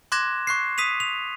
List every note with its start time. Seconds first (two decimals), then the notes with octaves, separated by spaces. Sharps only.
0.12 C6 D6 F#6 G#6 A#6 E7
0.47 C#6 F#6 C7
0.78 D#6 B6 D#7 F7
1.00 F7